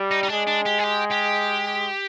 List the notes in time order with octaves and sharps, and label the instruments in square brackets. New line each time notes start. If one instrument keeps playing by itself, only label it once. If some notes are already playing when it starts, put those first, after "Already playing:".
Already playing: [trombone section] G3
[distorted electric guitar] D#4
D#4
[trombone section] G#3 [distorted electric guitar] D4
[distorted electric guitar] D4
G4
G#4
G4
G4